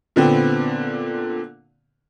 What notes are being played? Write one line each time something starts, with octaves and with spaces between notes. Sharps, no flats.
A#2 D3 B3 C4